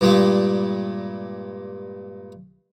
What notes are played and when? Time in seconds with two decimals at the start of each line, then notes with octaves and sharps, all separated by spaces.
0.01 G2 A#2 G3 G#3